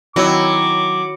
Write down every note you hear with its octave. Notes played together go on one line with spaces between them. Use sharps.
D#3 F#3 C4 E4 D6